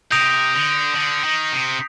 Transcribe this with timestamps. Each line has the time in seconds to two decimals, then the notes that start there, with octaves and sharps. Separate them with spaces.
0.11 C3 D#6 G6 A#6 D7 F7
0.54 D3
0.96 D3
1.24 D#3
1.52 C3